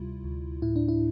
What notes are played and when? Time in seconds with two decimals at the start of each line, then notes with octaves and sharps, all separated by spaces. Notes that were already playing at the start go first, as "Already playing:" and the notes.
Already playing: D2 C3 G3 E4 F4
0.24 D2
0.62 A2 E4
0.76 D4
0.88 E4